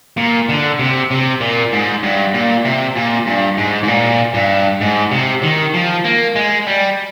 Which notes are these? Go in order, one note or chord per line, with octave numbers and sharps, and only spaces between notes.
A#2
D3
C3
C3
A#2
G#2
G2
A#2
C3
A#2
G2
G#2
G#2
A#2
G2
G#2
C3
D#3
F3
A#3
G#3
G3